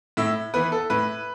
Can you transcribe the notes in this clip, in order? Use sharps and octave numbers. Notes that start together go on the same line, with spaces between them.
A2 E5
E3 B3 B4
A4
A2 B4